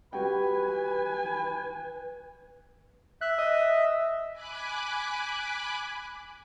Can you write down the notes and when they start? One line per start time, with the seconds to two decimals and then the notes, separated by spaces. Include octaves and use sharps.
0.13 G3 F#4 B4 G5 G#5 B5
3.21 E5 F#6
3.39 D#5
4.32 G#5 B5 D6 F#6